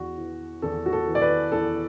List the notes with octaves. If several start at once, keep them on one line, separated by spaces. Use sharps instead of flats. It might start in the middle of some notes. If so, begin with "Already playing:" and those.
Already playing: E2 F#4
E3
E2 A4
F#4
A4
E3
D5
B4
E2 A4